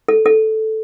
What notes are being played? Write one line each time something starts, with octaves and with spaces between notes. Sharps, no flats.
A4
A4